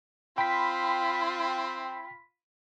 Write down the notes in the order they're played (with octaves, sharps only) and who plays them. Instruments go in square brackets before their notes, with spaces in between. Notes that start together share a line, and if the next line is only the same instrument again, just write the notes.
[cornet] C4 [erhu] F4 [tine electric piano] G5 [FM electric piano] B5 B6